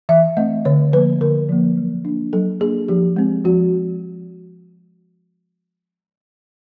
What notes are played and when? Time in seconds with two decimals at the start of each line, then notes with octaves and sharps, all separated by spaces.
0.09 E3 E5
0.37 A3 C4 D#5
0.65 D3 C#5
0.93 F3 A#3 B4
1.21 D3 A#4
1.49 F3 A#3
1.78 F#3
2.05 A#3 D4
2.33 F#3 A4
2.60 A#3 D4 G#4
2.88 F3 G4
3.16 G#3 C4
3.44 F3 F#4